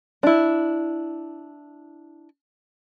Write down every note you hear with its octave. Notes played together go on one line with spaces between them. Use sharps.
D4 E4